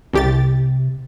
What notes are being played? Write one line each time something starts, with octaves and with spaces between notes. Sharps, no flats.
C2 C3 G4 A6